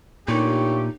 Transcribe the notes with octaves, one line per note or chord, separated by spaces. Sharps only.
A#2 A3 A#3 D4 D#4 G4 C#5 C#6